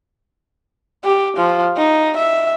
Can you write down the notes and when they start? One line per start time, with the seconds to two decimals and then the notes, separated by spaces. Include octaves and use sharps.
1.04 G4
1.37 F3
1.77 D#4
2.17 E5